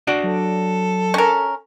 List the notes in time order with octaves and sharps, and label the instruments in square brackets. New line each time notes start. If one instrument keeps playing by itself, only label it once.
[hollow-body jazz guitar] D4 F#4 D5
[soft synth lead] F#3 [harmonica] A4
[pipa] C#4 A#4